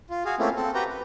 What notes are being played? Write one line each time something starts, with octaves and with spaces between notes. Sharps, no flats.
F4
F#4 G#4 F5
A3 A#3 C4 C#4 E4 F4
C4 A4
F#4 G4 B4 G5 A#5
B4